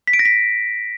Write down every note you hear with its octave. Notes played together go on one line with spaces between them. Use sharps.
B6
D7
A#6
B6